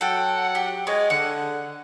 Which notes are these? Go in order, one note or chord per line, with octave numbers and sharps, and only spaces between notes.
F#3 A4 F#5 G5
G4
G#3 C#4
D3 F#5